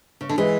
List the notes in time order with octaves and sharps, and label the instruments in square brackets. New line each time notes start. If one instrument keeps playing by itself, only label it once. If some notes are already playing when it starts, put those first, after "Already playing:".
[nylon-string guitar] C#3
D3
[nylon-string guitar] E3 [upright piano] G#3